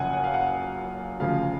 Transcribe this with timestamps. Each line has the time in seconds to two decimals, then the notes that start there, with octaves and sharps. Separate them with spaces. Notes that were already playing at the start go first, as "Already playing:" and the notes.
Already playing: F#1 F#2 C#3 F3 F#5 G#5
0.13 F#5
0.24 F5
0.34 F#5
1.20 D2 C#3 F3 F5